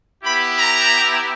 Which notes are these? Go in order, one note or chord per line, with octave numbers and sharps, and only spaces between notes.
B3 E4 G4 B5
A#5